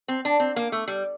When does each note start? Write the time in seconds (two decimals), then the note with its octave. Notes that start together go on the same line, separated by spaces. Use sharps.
0.08 C4
0.25 D4
0.40 C4
0.56 A#3
0.72 A3
0.88 G3